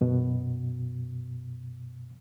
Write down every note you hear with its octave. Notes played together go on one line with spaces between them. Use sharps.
F#2 B2